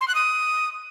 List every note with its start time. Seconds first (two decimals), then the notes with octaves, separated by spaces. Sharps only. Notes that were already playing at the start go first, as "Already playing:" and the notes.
0.01 C6
0.08 F#6
0.15 D#6